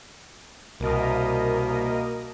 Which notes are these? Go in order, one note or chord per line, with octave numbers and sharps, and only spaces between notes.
C2 B2 A#3 A#4 D#5